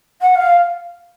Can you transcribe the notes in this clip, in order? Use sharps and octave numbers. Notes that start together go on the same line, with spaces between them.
F#5
F5